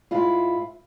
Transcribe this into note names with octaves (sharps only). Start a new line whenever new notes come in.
G#2 E4 F4